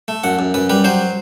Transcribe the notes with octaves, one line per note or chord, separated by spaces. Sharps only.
A3
F#2 F#5
F#2
F#2 B4
G3 B4
F#3 C5